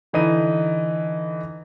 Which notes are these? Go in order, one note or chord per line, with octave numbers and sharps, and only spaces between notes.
D3 E3 D#4 D#7